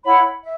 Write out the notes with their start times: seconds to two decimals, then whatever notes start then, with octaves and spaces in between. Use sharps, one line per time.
0.04 E4 C#5 F#5 B5
0.42 E5